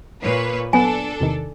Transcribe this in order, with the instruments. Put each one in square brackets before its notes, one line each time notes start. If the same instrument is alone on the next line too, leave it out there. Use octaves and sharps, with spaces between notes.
[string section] A#2 B4 C#5
[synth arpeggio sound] F#3 B3 F#6 [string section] D4 A4 [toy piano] G#5
[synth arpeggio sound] E2 C3 D#3